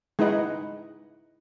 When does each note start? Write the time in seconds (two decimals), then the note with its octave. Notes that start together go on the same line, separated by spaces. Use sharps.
0.19 G#3 D#4 E4 B4 D#5 F#5